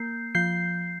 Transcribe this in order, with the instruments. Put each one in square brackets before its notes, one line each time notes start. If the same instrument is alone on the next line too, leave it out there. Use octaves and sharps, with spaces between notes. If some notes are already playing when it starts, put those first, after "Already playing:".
Already playing: [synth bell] A#3 G6 C7
F3 G6 C7